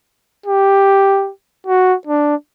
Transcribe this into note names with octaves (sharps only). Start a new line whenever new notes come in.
G4
F#4
D4